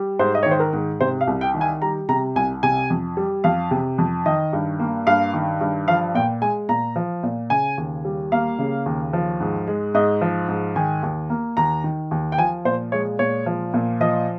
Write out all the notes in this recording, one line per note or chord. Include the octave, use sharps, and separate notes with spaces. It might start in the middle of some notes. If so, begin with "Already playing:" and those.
Already playing: G3
G#2 C5
D#5
D#3 C#5
C5
A#4
G#2
C3 C5
F5
C2
G5
D#3
G#5
G3 A#5
C3 A#5
C2 G#5
C3 G#5
F2
G3
F2 F5
C3
F2
D#3 D#5
G2
A#3
G2 F5
D#3
G2
F3 F5
A#2 G5
G#3 G#5
A#2 A#5
F3
A#2
C#3 G#5
D#2
G3
A#3 F5
C#3
D#2
F3
G#2
G#3
G#2 D#5
F3
G#2
D#3 G#5
D#2
A#3
D#2 A#5
D#3
D#2
G5
F3 G#5
A#2 C5
G#3 C#5
A#2 C#5
F3
A#2
F3 D#5